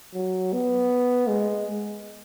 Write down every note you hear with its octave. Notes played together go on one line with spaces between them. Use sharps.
F#3
B3
G#3